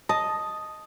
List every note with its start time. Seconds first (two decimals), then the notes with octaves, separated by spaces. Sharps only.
0.09 D#5 A5